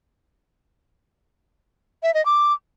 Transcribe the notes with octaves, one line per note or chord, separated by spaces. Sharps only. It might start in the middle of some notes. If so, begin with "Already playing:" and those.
E5
D#5
D6